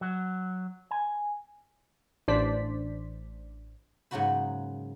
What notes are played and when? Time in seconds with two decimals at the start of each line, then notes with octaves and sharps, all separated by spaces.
0.01 F#3
0.91 G#5
2.28 A1 D4 C5 D5 B6
4.11 G#2 C#3 F#3 A#3 F#4 B5